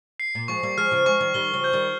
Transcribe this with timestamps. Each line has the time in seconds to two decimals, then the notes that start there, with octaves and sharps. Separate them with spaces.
0.20 C7
0.35 A#2
0.48 F3 G#3 C#6
0.63 G3 A#3
0.78 F3 G#3 F6
0.91 C#3 F3
1.06 F3 G#3 C#6
1.21 D#3 G3
1.34 D#3 G3 G7
1.53 C#3 F3
1.64 G6
1.73 D#3 G3